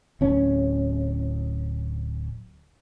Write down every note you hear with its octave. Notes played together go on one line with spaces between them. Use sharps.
D1 C#4